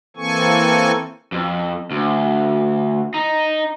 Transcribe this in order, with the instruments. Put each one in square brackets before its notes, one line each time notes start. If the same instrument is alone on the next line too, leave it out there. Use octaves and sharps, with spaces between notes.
[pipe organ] E3 A#3 C4 A4 G#5 C#6
[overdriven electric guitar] F2
D2
D#4